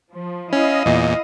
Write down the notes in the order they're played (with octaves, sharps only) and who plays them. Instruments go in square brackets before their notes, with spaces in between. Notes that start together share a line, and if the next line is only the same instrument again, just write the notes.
[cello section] F3
[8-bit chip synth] C#4 [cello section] E4 D#5 F5
[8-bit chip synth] E2 A#2